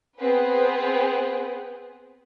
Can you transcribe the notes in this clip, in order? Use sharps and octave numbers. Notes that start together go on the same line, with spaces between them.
B3 C4 G#4 B4